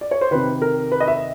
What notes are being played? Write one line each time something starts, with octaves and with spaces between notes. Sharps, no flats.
D5
C#5
C5
C3 D#3 B4
A#4
B4
D#5
E5